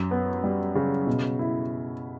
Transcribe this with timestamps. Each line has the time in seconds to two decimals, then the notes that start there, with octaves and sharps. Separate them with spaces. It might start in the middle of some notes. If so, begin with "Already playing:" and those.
Already playing: F#2
0.11 B3
0.44 G3
0.75 C#3
1.07 B2
1.39 E4